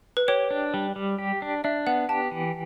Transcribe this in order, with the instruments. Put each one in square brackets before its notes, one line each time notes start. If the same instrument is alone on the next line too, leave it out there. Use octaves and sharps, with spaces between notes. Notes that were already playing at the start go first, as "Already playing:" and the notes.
[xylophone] B4
[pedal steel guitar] G4 [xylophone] C#5
[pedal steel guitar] D4
G3
G3
G4
D4
[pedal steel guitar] D4 [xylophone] E5
[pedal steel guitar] B3 [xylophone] F#5
[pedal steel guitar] G4 [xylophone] A5
[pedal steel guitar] E3